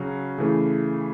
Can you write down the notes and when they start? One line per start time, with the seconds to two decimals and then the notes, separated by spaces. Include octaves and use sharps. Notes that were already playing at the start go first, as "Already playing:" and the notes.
Already playing: C#3 F#3 C#4 F#4
0.38 C#3 E3 A3